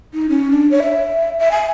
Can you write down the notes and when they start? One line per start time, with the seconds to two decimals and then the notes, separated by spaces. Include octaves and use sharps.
0.14 D#4
0.29 C#4
0.51 D4
0.71 C#5
0.83 E5
1.40 E5
1.52 G#5